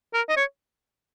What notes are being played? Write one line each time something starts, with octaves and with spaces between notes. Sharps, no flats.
A#4
D#5
C#5